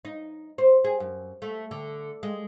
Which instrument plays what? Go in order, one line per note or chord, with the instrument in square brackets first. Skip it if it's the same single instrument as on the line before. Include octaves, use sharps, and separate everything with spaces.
[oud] D#4
C5
G#4
F#2
A3
D3
G#3